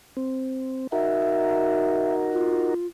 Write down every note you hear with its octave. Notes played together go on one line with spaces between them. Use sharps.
C4
D#4 F#4 A#4 E5
F4